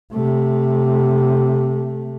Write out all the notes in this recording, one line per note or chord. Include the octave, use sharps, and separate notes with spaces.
C3 A3